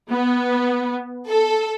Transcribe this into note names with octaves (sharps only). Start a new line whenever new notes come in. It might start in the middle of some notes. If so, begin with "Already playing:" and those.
B3
A4